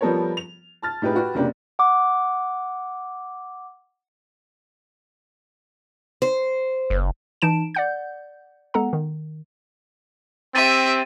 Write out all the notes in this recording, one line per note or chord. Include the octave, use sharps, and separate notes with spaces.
F3 G3 B3 A4 A#4 C#5
F7
A5 F6 A6
A2 D#4 G4 G#4 B4
F#4 G4 B4
F1 C#3 A#3 D4 G4
F#5 D6
C5
F#1
E3 D#4 A5 D7 E7
D5 F#5 G6
G#3 B3 A4 F#5 A#5
D#3
C4 G4 E5 A6 A#6 D#7